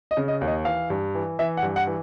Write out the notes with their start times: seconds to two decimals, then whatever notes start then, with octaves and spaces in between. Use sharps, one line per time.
0.11 D#5
0.17 C#3
0.28 D#5
0.41 D#2
0.47 D#5
0.65 E3 F5
0.90 G2
1.15 E3
1.39 E3 E5
1.57 F#5
1.63 G2
1.76 F#5
1.87 E3